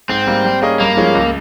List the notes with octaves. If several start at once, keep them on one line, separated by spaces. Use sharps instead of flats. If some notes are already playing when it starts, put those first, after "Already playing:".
G#2 C4
G3 A#3
G3
A#3 C#4 G#4 D#5
G2 A#3
F3 G#3 C#4 G#4
C#2